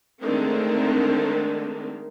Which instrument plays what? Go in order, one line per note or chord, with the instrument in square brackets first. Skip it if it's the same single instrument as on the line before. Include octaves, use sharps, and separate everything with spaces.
[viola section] D3 D#3 G#3 A3 C4 A#4